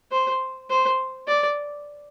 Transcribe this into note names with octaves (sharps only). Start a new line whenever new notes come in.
C5
C5
D5